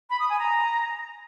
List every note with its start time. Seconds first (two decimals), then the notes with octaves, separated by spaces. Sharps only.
0.10 B5
0.20 D#6
0.29 G#5
0.39 A#5